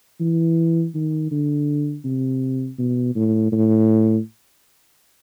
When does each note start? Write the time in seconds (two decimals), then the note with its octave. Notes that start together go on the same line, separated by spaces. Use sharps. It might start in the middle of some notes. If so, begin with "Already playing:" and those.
0.20 E3
0.95 D#3
1.31 D3
2.04 C3
2.79 B2
3.15 A2
3.52 A2